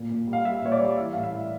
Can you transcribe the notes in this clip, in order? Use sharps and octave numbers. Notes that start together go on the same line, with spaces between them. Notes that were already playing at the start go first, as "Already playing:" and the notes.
Already playing: A#2
A#2
G3
F5
G3 E5
A#2 C#5
D5
G3
E3 E5
A2 F5
E5
E3